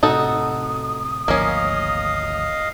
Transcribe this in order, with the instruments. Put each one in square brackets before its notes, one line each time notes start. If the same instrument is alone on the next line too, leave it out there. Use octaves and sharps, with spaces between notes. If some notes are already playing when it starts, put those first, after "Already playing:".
[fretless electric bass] A2 C3 [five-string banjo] D#4 F#4 A4 [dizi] D#6
[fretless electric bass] G#1 D2 F3 [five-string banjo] A#3 C#4 [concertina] D#5 F5